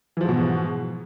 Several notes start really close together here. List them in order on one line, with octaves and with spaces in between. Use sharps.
E3 F3 G#2 B2